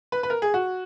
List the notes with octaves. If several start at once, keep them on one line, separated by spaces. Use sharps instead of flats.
B4
B4
A#4
G#4
F#4